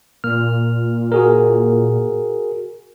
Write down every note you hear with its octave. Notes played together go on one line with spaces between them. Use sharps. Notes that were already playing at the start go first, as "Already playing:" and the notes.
A#2 F6
F#4 G#4 A#4